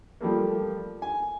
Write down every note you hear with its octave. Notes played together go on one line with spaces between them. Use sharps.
F3 G3 A3 A#3
G#5